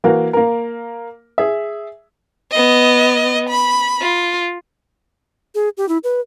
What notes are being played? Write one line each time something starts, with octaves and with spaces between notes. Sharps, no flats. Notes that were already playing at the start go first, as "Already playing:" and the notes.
E3 A#3 F#4 A#4
A#3 A#4
G#4 E5
B3 D#5
B5
F4
G#4
G4
E4
B4